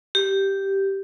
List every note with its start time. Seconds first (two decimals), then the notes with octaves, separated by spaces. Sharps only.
0.15 G4